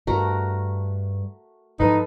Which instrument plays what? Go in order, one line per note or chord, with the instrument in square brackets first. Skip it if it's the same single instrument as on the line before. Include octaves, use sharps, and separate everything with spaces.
[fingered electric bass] G2 [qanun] A3 F#4 A#4
[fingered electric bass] G#2 E3 F3 [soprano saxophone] D#4 [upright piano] A4 B4